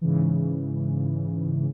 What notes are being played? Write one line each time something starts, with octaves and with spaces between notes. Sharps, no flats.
G#2 C#3 E3